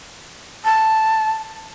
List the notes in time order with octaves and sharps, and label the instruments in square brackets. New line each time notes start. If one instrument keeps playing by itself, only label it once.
[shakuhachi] A5